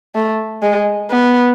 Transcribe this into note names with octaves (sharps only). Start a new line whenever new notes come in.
A3
G#3
B3